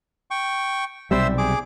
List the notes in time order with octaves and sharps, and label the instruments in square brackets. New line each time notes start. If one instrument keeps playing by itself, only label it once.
[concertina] G5 C#6
[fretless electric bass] B1 C3 G3 [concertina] C5 E5 E6
[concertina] G#4 D6